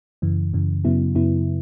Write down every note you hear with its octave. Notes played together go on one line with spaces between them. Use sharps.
F#2 C#3 E3
F#2 C#3 E3
F#2 C#3 F#3 B3 E4
F#2 C#3 F#3 B3 E4